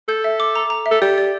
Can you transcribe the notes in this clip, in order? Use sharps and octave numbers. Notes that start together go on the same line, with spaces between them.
A4 G6
E5
D6
A#5
A#5
E5
A4
G4 D5
D5